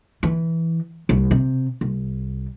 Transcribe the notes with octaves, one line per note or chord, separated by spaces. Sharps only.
E3
C2
C3
C2